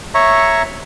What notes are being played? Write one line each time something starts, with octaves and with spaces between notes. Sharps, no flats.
C#5 E5 A#5 C#6